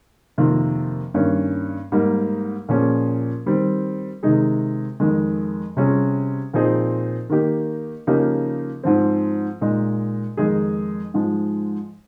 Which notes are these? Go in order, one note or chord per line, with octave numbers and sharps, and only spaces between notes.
F2 C3 D#3 A#3 F4
G2 D#3 A#3 C#4
G#2 G3 A#3 D#4
A#2 F3 A#3 C#4 G#4
D#3 G3 C4
C3 D#3 G#3 D#4 G#4
F2 D#3 G#3
C3 G3 C#4 F4 G#4
A#2 F3 C4 D#4 G#4
D#3 A#3 D#4 G4
C#3 F3 A#3 D#4 G4
G#2 F3 C4
A#2 G#3 D#4
F2 D#3 G#3 D#4 G#4
G#2 F3 G#3